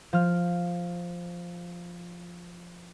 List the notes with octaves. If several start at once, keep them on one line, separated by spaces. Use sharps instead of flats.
F3 F6